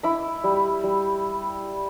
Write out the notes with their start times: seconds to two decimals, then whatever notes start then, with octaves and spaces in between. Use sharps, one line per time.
0.03 E4 B5 D6
0.44 G3
0.84 G3